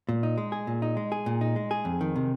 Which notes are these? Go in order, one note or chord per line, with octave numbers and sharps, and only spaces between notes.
A#2
D#4
G#3
G#4
A#2
D#4
G#3
G#4
A#2
D#4
G#3
G#4
F2
D#3
C3